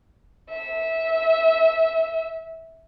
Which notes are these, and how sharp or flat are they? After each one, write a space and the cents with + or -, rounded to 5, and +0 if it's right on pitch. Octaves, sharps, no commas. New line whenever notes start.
E5 -20